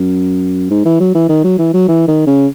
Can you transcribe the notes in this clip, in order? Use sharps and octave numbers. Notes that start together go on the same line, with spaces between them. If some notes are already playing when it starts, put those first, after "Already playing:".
Already playing: F#2
G#2
E3
F#3
E3
D#3
F#3
E3
F#3
E3
D#3
C#3